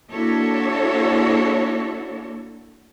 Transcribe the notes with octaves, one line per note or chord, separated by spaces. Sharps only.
A#3 D4 E4 F#4 A4 C#5